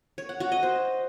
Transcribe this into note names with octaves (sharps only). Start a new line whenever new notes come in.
C#5
F#5
F#4
D#5
C5